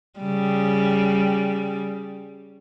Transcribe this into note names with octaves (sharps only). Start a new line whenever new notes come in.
C#3 G3